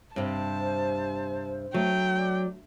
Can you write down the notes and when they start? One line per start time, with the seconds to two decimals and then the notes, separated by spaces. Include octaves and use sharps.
0.16 G2 C3 C5 A5
1.74 F#3 A3 G5
2.17 D5